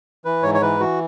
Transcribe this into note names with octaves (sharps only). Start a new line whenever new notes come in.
E3 B4
G#2 C#5
C#5
E3 B4
E3 F#4